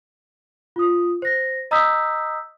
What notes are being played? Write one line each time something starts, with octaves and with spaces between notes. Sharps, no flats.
F4 D#6
C5 A#6
D#5 A#5 D#6 E6 G6 B6